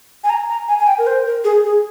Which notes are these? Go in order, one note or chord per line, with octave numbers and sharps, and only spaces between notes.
G#5
A#5
A#5
G#5
G#5
G5
A#4
C5
A#4
G#4
G#4